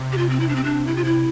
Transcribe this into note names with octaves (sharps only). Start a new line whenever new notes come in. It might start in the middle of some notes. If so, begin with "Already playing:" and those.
Already playing: C3
G4
F4
C4
E4
D4
C4
D4
E4
F4
E4